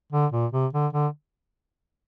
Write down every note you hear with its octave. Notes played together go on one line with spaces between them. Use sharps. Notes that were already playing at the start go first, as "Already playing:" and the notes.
D3
A#2
C3
D3
D3